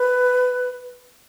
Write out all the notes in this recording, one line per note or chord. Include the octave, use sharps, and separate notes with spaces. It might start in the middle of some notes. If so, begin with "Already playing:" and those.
Already playing: B4